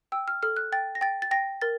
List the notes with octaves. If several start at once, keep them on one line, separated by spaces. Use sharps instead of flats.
G5 E6
F6
A4 F6
F#6
G5 A6
A#6
G5 A6
A6
G5 A#6
A#4 A6